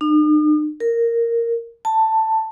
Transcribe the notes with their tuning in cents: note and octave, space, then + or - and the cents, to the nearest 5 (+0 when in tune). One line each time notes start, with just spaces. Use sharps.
D#4 -45
A#4 -5
A5 +10